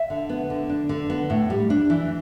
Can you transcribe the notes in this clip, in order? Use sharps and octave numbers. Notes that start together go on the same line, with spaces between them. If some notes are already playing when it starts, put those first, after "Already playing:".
Already playing: E5
D3
B3
D3
D4
D3
B3
A2
G3
D4
E3